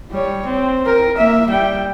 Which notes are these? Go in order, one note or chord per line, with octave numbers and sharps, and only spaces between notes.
G3 C#5
C4
A#4
A#3 E5
G3 G5